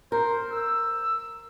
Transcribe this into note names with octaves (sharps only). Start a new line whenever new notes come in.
A#4 C5
E6